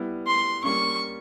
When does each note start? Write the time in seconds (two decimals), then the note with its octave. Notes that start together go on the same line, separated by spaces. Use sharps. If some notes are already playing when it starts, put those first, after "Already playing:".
Already playing: G3 B3 E4
0.27 C6
0.64 G3 A#3 C#4 C#6